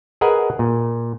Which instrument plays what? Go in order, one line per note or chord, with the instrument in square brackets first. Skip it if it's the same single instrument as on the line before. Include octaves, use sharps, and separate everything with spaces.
[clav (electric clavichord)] G#4 A#4 B4 D#5 F#5 G#5
A#2